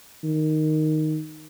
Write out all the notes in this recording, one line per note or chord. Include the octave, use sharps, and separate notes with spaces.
D#3